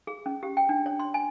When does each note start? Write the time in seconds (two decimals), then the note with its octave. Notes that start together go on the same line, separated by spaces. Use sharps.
0.07 G#4
0.26 C#4
0.43 G4
0.57 G5
0.69 D4
0.86 C#5
1.00 C6
1.14 G#5